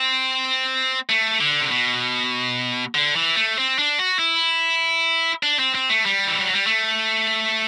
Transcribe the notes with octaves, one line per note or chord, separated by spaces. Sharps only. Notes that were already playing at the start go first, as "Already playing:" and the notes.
Already playing: C4
A3
D3
C3
B2
D3
E3
A3
C4
D4
F#4
E4
D4
C4
C4
A3
G3
E3
F#3
G3
A3